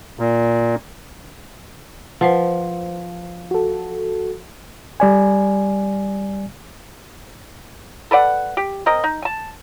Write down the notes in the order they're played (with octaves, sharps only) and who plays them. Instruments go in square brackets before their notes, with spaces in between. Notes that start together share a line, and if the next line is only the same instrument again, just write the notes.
[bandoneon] A#2
[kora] F3 [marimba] B4 C5 F#5
[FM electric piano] F#4 A4
[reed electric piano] G3 D5 G#5
[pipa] A4 B4 D5 F#5
G4
C4 A#4 D#5
D#4
G#5 A5